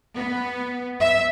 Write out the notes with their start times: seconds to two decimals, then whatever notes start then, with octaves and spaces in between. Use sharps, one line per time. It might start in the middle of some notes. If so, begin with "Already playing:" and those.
0.15 B3
0.99 E5